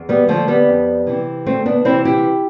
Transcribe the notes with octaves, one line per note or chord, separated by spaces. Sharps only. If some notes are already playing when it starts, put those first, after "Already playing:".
Already playing: E2
G3 B3
D3 F3 A3
G3 B3
F2
C3 E3
D2 A3 C4
B3 D4
C3 E3 C4 E4
E4 G4